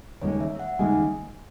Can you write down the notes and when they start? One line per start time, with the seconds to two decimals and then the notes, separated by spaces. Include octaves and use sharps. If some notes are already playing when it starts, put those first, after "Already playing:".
0.21 D#2 C#3 G#3 C#5
0.41 E5
0.55 E5
0.60 F#5
0.79 D#2 C#3 G#3 G#5